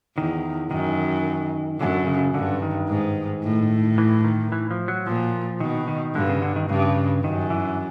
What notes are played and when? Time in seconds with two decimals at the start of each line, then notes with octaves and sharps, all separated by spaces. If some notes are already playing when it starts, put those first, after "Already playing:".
0.17 E2 D#3
0.71 F#2 D#3
1.80 F#2 D3
2.07 C#3
2.34 G2 D3
2.62 D#3
2.88 G#2
3.43 A2
3.98 E3
4.24 D#3
4.52 E3
4.71 F3
4.88 F#3
5.07 A#2 F3
5.60 B2 D#3
5.88 D#3
6.15 G2 D3
6.29 C#3
6.42 D3
6.56 D#3
6.69 G2 C#3
7.24 F#2 D#3
7.50 E3